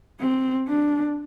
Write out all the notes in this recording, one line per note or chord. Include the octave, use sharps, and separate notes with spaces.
C4
D4